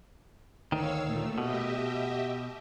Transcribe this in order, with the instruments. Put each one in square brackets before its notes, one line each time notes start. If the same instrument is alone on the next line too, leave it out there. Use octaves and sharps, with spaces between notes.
[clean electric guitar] D2 D#3 [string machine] C#5 F5 E6
[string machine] A#2 A3
[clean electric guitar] B2 [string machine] G4 D#5 E5